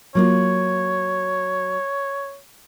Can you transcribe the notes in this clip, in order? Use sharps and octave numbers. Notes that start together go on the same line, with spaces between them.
F#3 A#3 F4 C#5